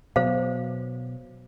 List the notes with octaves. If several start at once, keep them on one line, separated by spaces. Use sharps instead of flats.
B2 F#3 C5 F5